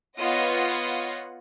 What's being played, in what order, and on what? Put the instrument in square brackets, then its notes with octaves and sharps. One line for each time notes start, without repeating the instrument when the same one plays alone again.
[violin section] B3 F4 C#5 D#5 F#5